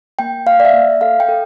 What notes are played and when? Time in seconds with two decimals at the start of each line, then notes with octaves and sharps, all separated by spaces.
0.19 A#3 G5
0.46 A#3 F5
0.60 D5
0.65 E5
0.74 A#3
1.01 A4 F5
1.20 G5
1.29 A4